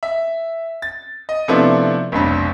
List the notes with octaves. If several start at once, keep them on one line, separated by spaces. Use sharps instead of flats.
E5
A6
D#5
C3 F3 A3 B3 D4 E4
F1 B1 G2